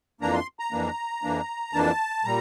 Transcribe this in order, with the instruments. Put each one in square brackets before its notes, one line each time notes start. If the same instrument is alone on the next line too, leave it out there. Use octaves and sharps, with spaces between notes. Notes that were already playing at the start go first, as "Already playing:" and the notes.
[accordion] F2 E3 A#3 D4 A#5
C6
A#5
F2 E3 A#3 D4
F2 E3 A#3 D4
F2 E3 A#3 D4 A5
A#2 G3 A#5